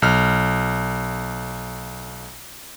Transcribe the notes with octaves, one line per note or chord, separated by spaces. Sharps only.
B1 F6